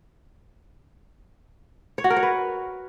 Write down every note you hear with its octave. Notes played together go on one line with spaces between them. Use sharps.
C#5
F#4
A#4
C#5
B4